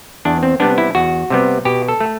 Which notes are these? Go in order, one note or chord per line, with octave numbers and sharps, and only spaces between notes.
E2 D4
C4
C3 G3 B3 D4
E4
E2 F#4
C3 G3 B3
B2 G4
A4
A3